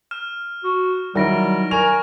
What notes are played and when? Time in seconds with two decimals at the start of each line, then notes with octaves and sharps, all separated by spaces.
0.11 F6 E7
0.64 F#4
1.15 D#3 F#3 G3 E4 F6 A#6 D7
1.71 A#4 G#5 C#6 F7